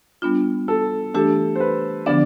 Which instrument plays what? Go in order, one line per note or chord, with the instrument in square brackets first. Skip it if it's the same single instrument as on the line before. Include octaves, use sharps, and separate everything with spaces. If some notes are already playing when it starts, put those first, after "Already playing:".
[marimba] G3 B3 D4 F4
[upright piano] A4
[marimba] E3 A3 D4 G4 [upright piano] A4
[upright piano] C5
B4
[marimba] D3 F3 B3 D4 [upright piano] D5